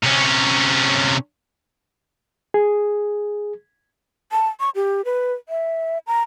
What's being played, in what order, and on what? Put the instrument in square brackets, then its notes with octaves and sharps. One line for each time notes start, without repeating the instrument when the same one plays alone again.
[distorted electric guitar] C3 C#4
[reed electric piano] G#4
[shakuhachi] A5
C#6
G4
B4
E5
A#5